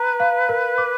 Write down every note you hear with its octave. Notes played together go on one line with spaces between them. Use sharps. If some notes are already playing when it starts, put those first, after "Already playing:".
Already playing: B4 A#5
F5
A#4
D6